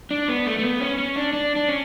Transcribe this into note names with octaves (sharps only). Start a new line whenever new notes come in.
D4
B3
A3
A3
B3
C#4
C#4
D4
D4
D4
C#4